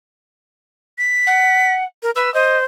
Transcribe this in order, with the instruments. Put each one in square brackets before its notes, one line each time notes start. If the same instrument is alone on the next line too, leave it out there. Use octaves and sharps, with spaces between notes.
[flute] B6
[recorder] F#5
[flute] A#4
[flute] B4 [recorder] E6
[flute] C5 [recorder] D#5